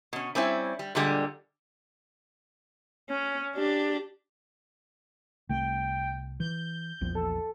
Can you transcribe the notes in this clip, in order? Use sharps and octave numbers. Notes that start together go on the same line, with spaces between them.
B2 C#4
G3 C4 C#4 E4
G3
A#2 D3 G3 G#3
C#4
D4 G4
C2 A3 G5
E3 G6
A#1 E2 F3
A4